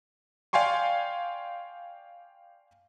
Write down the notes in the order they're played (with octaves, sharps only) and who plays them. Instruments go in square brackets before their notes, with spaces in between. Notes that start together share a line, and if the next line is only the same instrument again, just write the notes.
[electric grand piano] D5 F5 G5 G#5 C6 C#6